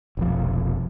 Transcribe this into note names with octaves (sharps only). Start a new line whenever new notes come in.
F1 B1 F3